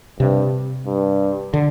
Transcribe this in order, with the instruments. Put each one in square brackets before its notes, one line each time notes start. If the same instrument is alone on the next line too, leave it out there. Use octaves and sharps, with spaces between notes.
[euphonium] G2 [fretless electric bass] C3
[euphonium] G2
[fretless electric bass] D3